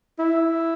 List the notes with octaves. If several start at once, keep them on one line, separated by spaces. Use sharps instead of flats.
E4